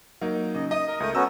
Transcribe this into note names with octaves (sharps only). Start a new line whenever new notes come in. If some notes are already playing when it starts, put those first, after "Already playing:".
F#3 A#3 D#4
C#3 D#5
D#5 D#6
A#4
C#2 A3 A#4 D#6 G6
B3 C#4 F#4 A4 A#5 E6